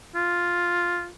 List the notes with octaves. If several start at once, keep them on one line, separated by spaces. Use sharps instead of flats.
F4